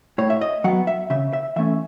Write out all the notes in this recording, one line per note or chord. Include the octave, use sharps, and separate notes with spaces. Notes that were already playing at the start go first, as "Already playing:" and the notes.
A2 C#5
E5
D#5
F#3 B3 F#5
E5
C#3 E5
E5
E3 A3 C#4 E5